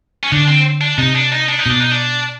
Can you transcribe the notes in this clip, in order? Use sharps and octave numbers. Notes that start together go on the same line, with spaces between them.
C#4
D3 D4
C4
D4
C3 D#4
D4
D#4
D4
D#4
B2 D4
D#4
D4